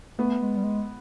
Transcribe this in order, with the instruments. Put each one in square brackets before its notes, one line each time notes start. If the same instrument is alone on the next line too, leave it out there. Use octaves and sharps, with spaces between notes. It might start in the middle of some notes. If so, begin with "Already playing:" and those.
[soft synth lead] A3 [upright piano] B3
[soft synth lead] G#3
G3
G#3